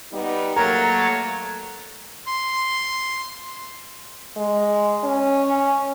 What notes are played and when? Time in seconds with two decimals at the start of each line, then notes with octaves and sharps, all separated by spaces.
0.13 G3 B3 D#4
0.56 F#3 A3 A#3 A#4 C#5 A#5 A6
2.26 C6
4.37 G#3
5.04 C#4